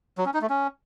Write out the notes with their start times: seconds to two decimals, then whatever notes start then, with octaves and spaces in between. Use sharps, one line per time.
0.18 F#3
0.26 C#4
0.34 D#4
0.42 A3
0.50 C#4